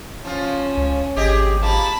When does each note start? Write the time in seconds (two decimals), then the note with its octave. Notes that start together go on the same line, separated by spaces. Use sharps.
0.25 F3 C#4 F4
0.77 C#2
1.16 G#1 G4 G#4 D#5
1.63 F3 A#3 A5 B5